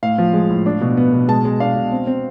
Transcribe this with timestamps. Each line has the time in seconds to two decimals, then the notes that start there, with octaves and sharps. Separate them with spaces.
0.03 A2 F5
0.18 F3
0.33 G#3
0.50 A2
0.66 D4
0.81 B2
0.97 B3
1.13 B2
1.28 G#3 A5
1.45 G#3
1.60 D4 F5
1.76 B2
1.92 C4
2.07 C4